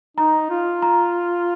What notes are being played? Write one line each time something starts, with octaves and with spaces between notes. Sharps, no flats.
D#4 A#5
F4
A#5